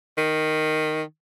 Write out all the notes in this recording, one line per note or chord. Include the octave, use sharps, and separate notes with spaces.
D#3